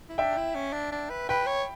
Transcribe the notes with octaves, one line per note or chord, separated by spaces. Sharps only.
E4
D4 E5 G5
E4
C#4
D4
D4
B4
B4 G5 B5
C#5